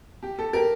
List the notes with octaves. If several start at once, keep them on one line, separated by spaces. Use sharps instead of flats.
G4
A4
G4 A#4